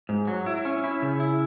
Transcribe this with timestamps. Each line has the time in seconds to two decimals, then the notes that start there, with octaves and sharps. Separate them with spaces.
0.09 G#2
0.27 F#3
0.46 E4
0.65 C#4
0.84 E4
1.02 C#3
1.20 E4